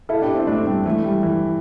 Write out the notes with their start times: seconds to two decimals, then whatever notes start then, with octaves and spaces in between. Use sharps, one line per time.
0.09 E4 A4
0.22 D4 G4
0.34 C4 E4
0.47 A3 D4
0.66 G3 C4
0.86 E3 A3
1.04 G3
1.23 E3